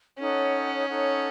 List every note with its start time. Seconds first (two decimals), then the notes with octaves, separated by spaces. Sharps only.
0.19 C#4 D#4 A4 C#5 F#5
0.87 D#4 A4 C#5 F#5